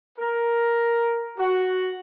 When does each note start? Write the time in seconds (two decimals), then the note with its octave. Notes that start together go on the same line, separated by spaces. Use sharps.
0.19 A#4
1.39 F#4